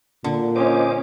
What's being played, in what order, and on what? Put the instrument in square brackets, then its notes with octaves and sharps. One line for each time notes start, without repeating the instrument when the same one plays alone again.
[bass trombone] A#2 [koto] D3
[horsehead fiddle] C#4 [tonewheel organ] C5 D#5 D6